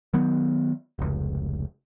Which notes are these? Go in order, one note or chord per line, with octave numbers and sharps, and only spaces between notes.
D#3 F#3 B3
F1 C#2